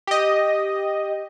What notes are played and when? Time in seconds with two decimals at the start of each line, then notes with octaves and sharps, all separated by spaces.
0.07 G4 D#5